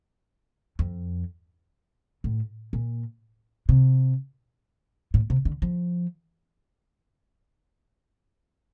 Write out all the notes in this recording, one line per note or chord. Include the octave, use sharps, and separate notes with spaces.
F2
A2
A#2
C3
A2
C3
D3
F3